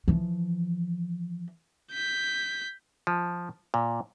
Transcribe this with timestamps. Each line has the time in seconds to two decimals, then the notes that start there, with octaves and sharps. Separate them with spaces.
0.08 E3 F3
1.92 G6 B6
3.07 F3
3.74 A#2